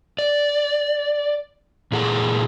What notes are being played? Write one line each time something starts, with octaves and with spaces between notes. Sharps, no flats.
D5
A#2 E3 G#4 F#5 A#5